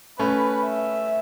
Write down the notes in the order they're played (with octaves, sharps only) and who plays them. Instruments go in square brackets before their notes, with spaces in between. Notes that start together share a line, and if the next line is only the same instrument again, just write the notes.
[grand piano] A3 C#4 [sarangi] B4
[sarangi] E5